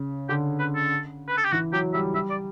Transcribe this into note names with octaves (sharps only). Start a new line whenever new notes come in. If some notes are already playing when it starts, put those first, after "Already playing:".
Already playing: C#3
D3 G4
B4
A4
B4
A4
G4
E3 F#4
F#3 G4
G3 E5
G3 E5
D5